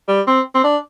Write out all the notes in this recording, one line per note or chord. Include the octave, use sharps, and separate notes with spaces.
G3
C4
C4
D4